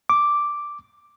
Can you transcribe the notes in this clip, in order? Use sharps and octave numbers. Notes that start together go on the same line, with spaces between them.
D6